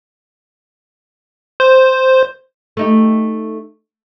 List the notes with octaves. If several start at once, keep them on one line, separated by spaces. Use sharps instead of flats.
C5
A3 D#4 G4